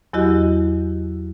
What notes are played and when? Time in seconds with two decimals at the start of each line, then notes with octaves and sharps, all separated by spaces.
0.13 E2 F#3 E4 F#4 G4 D#5